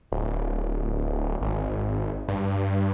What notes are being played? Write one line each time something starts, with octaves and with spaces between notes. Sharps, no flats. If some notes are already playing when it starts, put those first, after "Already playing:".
D1
G#1
G2